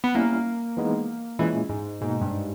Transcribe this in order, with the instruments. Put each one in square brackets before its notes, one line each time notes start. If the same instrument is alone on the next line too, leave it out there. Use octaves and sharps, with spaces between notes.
[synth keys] B3
[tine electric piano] G3 C#4 E4 [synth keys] A#3
[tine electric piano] E3 G#3 B3 D#4
[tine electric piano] A#2 G#3 C#4 E4 [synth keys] E3
[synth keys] G#2
[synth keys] G#2 [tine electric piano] B2 A#3 D#4
[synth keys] G2